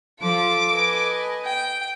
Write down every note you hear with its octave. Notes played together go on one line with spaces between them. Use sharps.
F3 F4 A4 D6
B4 D#5 G#5
G5